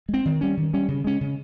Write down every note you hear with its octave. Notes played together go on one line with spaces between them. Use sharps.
G#3
C4
D#3
G3 C#4
D#3
G3 C#4
C#3
G#3 C#4
C#3